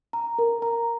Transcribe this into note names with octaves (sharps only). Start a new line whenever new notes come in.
A#5
A#4
A#5